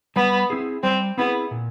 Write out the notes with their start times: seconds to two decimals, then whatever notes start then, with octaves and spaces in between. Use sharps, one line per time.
0.16 G3 B3
0.50 C4 E4 G#4
0.83 G3 C4
1.18 B3 C4 E4 G#4
1.51 A#2